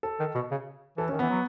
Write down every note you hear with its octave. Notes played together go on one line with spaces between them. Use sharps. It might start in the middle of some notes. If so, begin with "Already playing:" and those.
A4
D#3
B2
C#3
E3 A4
C#4
D#3
E3 B3
F#3